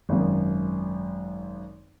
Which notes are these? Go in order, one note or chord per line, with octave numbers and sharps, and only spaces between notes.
G#1 F#2